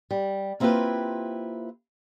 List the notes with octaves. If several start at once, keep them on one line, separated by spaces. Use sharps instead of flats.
G3
A#3 C4 E4 F4 G4 B4